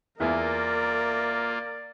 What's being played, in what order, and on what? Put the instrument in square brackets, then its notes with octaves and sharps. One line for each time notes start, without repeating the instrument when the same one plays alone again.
[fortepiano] E2 E4 G#4 [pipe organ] A#3 F4 [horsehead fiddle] A#4 [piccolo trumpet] D5